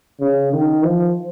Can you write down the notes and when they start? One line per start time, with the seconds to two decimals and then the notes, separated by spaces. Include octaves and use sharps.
0.20 C#3
0.52 D#3
0.84 F3